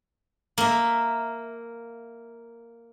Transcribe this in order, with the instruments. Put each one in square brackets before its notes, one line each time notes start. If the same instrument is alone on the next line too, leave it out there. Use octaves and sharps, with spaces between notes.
[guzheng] A#3 E5